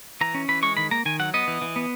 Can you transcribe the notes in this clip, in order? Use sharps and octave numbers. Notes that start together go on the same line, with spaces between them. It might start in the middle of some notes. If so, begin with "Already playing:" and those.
E3 A#5
C#4
E3 B5
G#3 C#6
D#3 B5
A#3 A#5
D#3 G#5
F#3 F#5
B3 D#5
E3
E3
B3